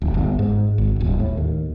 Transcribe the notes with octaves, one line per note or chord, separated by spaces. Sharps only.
D1
G1
G#2
G#1
D#1
A2
D#2